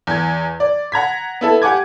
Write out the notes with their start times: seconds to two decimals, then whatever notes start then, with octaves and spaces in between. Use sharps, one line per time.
0.07 E2 G#6
0.60 D5
0.92 F#5 A#5 G#6 B6
1.41 B3 E4 A4
1.62 G4 F#5 G#5 D6 G#6